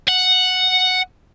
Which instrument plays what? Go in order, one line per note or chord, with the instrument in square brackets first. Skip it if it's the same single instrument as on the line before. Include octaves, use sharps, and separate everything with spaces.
[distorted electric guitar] F#5